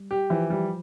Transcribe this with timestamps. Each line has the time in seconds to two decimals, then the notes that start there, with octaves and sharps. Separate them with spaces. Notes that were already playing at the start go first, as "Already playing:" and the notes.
Already playing: G3
0.11 G4
0.30 E3 F3
0.50 G3